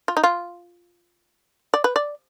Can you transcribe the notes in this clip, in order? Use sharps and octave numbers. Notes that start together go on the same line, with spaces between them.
F4
D#4
F4
D5
B4
D5